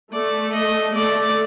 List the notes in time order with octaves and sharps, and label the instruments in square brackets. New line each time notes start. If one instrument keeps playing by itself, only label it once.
[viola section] A3 [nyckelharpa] D5
[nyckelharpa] D#5
[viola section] A3 [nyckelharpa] D5